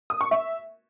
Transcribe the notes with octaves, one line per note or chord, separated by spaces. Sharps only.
D#6
C#6
E5